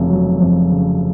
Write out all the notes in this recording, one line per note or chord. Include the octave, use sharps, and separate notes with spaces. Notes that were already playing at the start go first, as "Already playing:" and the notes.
Already playing: F1 C#3
F#3
F2
C#3